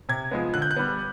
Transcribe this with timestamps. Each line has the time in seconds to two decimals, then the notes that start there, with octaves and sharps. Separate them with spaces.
0.09 C3 G#6
0.31 F3 G#3 B3
0.54 D3 F#6
0.62 G6
0.71 F#6
0.77 G3 B3